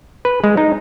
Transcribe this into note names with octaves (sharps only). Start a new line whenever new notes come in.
B4
G#3
D#4